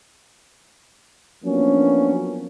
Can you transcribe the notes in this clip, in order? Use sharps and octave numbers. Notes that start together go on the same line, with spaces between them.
F3 F#3 A#3 B3 C#4 D4